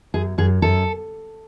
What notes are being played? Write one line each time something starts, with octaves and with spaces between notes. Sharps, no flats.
F#2 G#4
F#2 G#4
F#2 A4